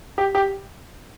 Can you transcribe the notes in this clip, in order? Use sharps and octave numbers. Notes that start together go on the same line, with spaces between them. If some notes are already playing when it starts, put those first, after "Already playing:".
G4
G4